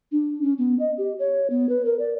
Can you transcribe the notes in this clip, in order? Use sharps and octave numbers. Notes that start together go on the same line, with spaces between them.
D4
C#4
B3
D#5
G4
C#5
B3
B4
A#4
D5